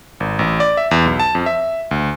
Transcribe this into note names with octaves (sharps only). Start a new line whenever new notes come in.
G#1
A1
D5
E5
E2
B1
A5
F2
E5
D2